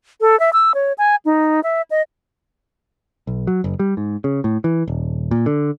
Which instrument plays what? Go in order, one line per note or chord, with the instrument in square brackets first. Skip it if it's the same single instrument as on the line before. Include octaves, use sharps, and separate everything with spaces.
[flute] A4
E5
E6
C#5
G#5
D#4
E5
D#5
[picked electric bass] B1
F#3
F#1
G3
G#2
C#3
A2
E3
D#1
A#2
D3